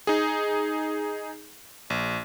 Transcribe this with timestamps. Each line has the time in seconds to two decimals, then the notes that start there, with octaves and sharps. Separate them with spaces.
0.07 D#4 G#4
1.90 A#1